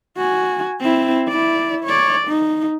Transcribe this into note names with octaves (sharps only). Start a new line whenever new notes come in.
F#4 G#5
C4 E4
E4 D5
C#5 D5
D#4